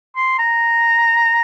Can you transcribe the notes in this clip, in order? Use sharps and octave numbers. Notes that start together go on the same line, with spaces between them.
C6
A#5